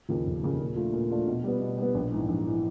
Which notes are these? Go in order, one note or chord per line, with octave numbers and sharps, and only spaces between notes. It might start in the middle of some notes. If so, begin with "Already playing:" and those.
D#2 C#3 F3
F1
D#2 C#3 F3
A#2
F3 A3 D4 F4
A#2
F3 A3 D4 F4
B2
G3 B3
B2
G3 B3
A#1
G#2 E3
A#1
E3